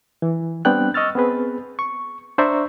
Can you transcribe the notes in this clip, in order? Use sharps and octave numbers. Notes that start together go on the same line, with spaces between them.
E3
G3 B3 C4 D4 G5 F#6
D#5 C#6 E6 F6 A6
B3 C4 G#4 B4
C#6
D4 C5 D5 E5 A#5 C#6